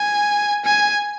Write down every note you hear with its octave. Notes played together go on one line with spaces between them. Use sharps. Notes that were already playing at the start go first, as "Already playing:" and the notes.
Already playing: G#5
G#5